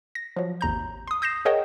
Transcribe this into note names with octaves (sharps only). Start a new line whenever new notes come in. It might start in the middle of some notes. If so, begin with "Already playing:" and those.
A#6
F3 F#3
G#1 D#2 A#5 G6
C6 D#6
D#6 G6 A#6 C7 E7
G#4 A#4 C#5 D#5 F#5 G5